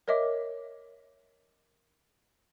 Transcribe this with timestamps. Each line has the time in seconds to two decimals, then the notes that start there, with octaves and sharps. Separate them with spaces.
0.08 A#4 C#5 D#5 E5 D6